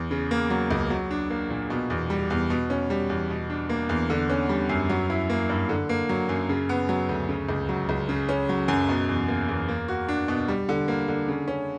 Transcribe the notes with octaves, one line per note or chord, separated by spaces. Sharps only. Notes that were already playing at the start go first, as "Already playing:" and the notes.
Already playing: E2
C#3
A#3
F#3
C#2
F#3
D4
A#3
A#2
B2
E2
G3
E2
B2
C#4
G3
E2
B2
D4
A#3
E2
D3
C#4
G3
F#2
F#3
E4
A#3
G2
D3
A#3
F#3
F#2
C#3
B3
F#3
D2
C#3
C#2
F#3
C#2
C#3
C#4
F#3
F#2
B2
E2
A#3
E2
A#3
F#4
D4
B2
G3
D3
A#3
D3
C#3
C#4